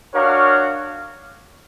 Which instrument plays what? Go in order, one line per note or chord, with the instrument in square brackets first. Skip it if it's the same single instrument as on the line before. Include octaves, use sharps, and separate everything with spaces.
[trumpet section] D4 F#4 A#4 C#5 F5